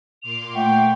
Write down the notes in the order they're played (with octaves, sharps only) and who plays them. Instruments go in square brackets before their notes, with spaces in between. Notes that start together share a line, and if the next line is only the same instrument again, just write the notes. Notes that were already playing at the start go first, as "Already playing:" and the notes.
[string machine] A#2 C6 D6 [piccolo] F7
[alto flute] A3 [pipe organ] E5 F#5 C#6 [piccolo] G5